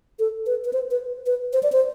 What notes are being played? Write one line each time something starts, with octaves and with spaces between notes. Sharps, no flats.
A4
B4
B4
C5
B4
B4
C5
D5
C5